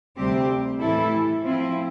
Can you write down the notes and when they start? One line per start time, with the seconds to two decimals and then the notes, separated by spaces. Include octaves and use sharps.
0.17 D2 C3 G3 C4 G4
0.81 A2 E3 A3 E4 A4
1.43 F3 C4 E4